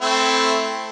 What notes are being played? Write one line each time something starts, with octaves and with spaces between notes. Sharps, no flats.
A3 C4 E4